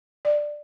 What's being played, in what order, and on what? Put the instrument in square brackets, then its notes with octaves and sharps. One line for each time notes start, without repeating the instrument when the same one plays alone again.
[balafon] D5